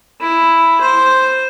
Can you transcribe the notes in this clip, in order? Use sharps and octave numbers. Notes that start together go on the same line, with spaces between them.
E4
C5